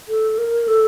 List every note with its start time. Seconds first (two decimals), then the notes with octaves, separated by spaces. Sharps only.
0.09 A4
0.38 A#4
0.68 A4